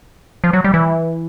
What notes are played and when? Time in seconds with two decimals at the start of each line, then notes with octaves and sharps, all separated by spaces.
0.44 F3
0.53 F#3
0.64 G3
0.74 E3